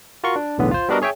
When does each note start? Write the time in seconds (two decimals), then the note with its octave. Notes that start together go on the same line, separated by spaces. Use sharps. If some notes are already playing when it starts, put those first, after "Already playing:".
0.24 F4 F#4 A#4 C6 C#6
0.36 D4
0.58 B1 E2 A2 D3 B3
0.71 F4 C5
0.89 G3 B3 D4 F#4 A#4 D#5
1.02 G#4 C#5 E5 G5 G#5